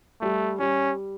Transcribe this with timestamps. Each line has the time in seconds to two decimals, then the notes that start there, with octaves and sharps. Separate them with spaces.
0.21 G3 A3
0.59 G3 C#4